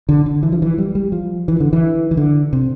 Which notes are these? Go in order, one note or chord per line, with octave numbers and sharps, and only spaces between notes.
D3
D3
E3
F3
E3
G3
G3
F3
E3
D3
E3
E3
D3
C3